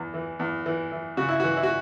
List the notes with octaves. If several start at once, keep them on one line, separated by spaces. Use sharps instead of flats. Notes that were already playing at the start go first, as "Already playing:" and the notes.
Already playing: E2
E3
E2
E3
E3
C#3 F#4
E4
E3 F#4
E4
F#4